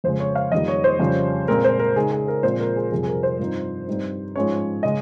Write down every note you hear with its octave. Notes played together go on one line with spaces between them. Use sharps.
F2 C#3 G#3 C5
C#5
F5
F2 D#3 G3 A#3 D#5
C#5
C5
F2 C#3 G3 C#4
A#2 G#3 C4 F4 A#4
C5
A#4
C#3 G#3 D#4 G#4
G#4
A#4
A#2 F3 G#3 C4 C5
A#4
G#4
F2 C3 G3 C4 G#4
G#4
A#4
C5
G2 F3 C4 D#4
G2 G3 C4 D#4
G#2 F3 G#3 C#4 C#5
C#3 G#3 D#5